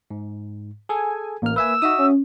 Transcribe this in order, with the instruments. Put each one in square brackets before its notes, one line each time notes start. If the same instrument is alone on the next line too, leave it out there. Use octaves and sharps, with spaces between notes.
[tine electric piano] G#2
[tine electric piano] G#4 A4 [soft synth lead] G#5
[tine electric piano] A1 F6 [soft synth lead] A#3
[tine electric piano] B4 E5 G#5 [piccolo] E6
[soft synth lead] D#4 [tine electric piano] F#4 E5 D#6
[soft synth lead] C#4